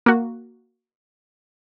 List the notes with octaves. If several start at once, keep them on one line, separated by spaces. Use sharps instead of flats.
A#3 F#4